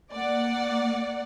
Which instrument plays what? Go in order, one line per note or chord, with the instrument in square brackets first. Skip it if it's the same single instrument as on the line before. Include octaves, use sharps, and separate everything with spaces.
[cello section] A#3 [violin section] D5 F#5